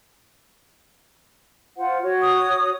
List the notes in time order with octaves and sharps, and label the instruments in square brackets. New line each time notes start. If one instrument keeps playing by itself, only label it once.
[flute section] F4 C5 F#5
F#4 C#5
[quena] D#6